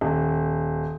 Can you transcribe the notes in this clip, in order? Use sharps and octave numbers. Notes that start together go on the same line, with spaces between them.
D#1